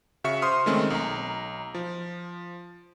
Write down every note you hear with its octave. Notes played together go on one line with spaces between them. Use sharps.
C#3 F#4 E5 C#6 C#7
C5 C6 D#6 F6
D#3 G#3 A3 C4 C#4
B1 A#5
F3